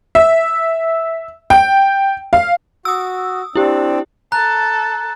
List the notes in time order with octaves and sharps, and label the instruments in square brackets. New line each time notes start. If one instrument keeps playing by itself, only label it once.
[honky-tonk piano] E5
G5
F5
[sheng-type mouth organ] F#4 [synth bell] D#6 E6
[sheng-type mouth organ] C4 D4 [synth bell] E4 G4
[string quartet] A4 A5 [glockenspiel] A#5 F#6